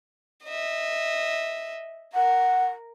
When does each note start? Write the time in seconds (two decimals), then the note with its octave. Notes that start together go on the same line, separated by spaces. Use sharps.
0.45 D#5 E5
2.15 A#4 F#5